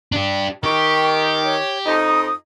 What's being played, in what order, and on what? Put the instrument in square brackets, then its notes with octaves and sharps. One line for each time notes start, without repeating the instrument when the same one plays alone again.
[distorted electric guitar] D4 G4
[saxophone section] D#3 [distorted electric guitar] G4 [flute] C#6
[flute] C#5
[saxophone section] F2 D#4 [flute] D#6